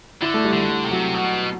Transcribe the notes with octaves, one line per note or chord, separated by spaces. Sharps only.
D3 E4
A3
G3
D3
A3
G3
C3
F#3
B2